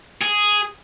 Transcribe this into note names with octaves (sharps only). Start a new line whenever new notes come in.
G#4